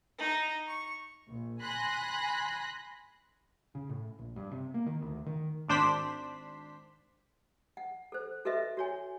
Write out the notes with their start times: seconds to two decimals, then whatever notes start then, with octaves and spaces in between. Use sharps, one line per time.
0.18 D#4
0.67 C#6
1.29 A#1
1.62 G#5 B5 C6 F#6 A#6
3.75 C#3
3.89 A2
4.19 A#1
4.36 G2
4.51 C3
4.74 A#3
4.86 D#3
5.02 D2
5.26 D#3
5.69 G#1 D4 C5 B6
7.77 F#5
8.12 A4 C5
8.45 F#4 A4 B4 D#5 E5
8.77 F#4 C#5 G#5